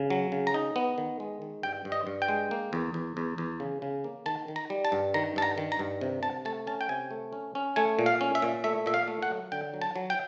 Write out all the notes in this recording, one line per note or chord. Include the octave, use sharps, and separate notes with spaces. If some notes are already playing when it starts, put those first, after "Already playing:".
Already playing: C#3
F#3
C#3
A#5
D#4
B3
D#3
G#3
D#3
G2 G5
G2
D#5
G2
G5
G#3
A#3
E2
E2
E2
E2
C#3
C#3
A#3
D#3 A5
D#3
A#5
G3
A5
G2
D#3 A#5
G2 A5
A#5
D#3
A#5
G2
C3
C3 A5
A3 A5
C#4 A5
G5
C3 G#5
A3
C#4
C#4
A3 G#5
A#2
F5
C#4
E5
A#2
A3 E5
A#2 E5
F5
A3
F#5
F#3
D3 G5
F#3
A5
F#3
G5